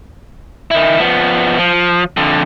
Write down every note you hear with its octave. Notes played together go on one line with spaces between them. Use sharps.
D#3 E4
F3 B3
F3
F2 D3